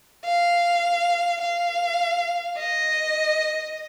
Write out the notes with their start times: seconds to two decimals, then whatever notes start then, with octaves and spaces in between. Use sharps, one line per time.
0.25 F5
1.41 F5
2.59 D#5